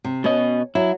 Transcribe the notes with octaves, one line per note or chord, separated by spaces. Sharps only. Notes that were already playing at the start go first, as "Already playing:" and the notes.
C3
B2 B3 C#4 D#5
F#3 E4